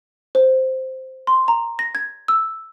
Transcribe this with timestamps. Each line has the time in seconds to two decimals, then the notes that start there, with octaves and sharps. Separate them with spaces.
0.35 C5
1.27 C6
1.48 A#5
1.79 A#6
1.95 G#6
2.28 E6